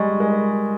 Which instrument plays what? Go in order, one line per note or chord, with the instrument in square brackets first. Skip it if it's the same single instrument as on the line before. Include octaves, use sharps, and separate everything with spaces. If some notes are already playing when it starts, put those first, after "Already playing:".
Already playing: [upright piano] G3 G#3 [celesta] D#5 G#5 C#6
[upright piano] G#3 [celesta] A#4